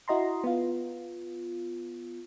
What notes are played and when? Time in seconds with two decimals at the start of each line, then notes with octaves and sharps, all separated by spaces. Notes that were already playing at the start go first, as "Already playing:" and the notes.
0.08 E4 F#4 D#5 A#5 C6
0.44 B3 F4